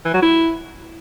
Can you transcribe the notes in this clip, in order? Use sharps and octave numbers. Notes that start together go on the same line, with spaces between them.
E3
F#3
E4